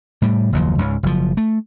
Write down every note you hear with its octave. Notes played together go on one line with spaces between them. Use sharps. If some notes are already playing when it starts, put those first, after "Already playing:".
A2 G3
F#1 D#2 F3
C#2 G#2
F#1 F3
A3